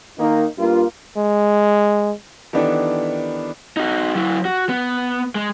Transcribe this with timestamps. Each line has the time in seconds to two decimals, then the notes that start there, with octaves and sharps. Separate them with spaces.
0.18 D#3 A#3 D#4
0.58 G2 A#3 F4
1.17 G#3
2.53 D#3 E3 B3 D4 G4 A4
3.77 D#4 F#4
4.15 F#3 E4
4.45 F#4
4.69 B3
5.35 G#3